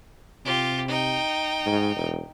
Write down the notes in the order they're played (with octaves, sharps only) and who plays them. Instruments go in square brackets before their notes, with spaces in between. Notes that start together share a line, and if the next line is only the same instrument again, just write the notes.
[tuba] C3 [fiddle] F4 G4
[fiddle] D#4 G5
[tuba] G#2
E1